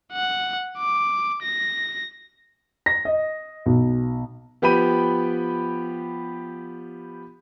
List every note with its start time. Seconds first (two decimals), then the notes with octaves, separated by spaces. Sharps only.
0.13 F#5
0.78 D6
1.43 A#6
2.86 A#6
3.05 D#5
3.66 B1
4.62 F3 B3 G4 G5 B5 D#7